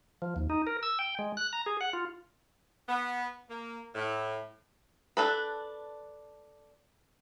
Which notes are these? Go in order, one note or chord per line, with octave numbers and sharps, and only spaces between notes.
F3
D#2
D#4
A#4
E6
G5
G#3
F#6
A#5
G#4
F#5
F4
B3
A#3
A2
D4 A4 B4